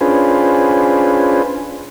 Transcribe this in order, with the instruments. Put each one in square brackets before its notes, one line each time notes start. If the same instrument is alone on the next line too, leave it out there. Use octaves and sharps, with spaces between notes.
[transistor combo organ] C#4 D4 F4 G#4 B4 C5